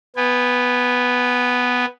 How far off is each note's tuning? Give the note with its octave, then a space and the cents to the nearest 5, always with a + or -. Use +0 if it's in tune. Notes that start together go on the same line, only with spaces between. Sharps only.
B3 +0 G#5 -35